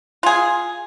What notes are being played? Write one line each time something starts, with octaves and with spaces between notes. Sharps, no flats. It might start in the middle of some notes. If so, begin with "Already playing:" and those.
F4 G#4